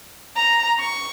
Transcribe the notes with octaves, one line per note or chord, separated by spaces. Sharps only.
A#5
C#6